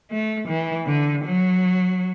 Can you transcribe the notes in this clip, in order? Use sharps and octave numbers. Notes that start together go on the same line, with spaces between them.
A3
E3
D3
F#3